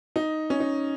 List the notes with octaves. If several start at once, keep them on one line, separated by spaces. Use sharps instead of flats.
D#4
C#4
D#4